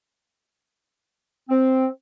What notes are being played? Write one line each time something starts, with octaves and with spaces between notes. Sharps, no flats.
C4